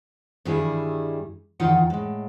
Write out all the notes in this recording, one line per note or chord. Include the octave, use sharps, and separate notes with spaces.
G2 D#3 G3 E4 G#4
E2 D#3 D#4 F4 F#5 G5
A2 G#3